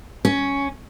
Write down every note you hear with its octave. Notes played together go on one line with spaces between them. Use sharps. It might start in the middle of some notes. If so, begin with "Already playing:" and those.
C#4